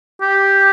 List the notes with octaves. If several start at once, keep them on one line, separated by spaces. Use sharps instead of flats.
G4